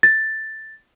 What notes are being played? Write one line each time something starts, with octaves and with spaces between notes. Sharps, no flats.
A6